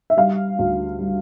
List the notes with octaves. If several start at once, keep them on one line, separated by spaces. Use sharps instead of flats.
E5
G3 F5
D2
G3